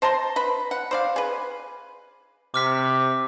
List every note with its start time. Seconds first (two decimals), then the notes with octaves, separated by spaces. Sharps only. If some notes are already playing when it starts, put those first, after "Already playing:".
0.02 C5 A5 A#5 C6
0.36 B4 B5
0.71 F#5
0.91 C5 D5 F5
1.16 G#4 B4
2.54 C3 D6 F6 B6